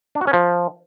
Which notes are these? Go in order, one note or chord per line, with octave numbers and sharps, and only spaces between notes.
D4
F#4
C#4
F3